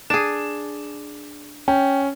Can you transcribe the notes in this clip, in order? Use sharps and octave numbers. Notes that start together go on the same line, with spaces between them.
D4 G#4 E7
C#4 G5